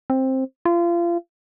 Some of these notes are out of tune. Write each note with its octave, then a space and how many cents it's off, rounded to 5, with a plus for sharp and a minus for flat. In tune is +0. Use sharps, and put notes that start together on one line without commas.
C4 +10
F4 -30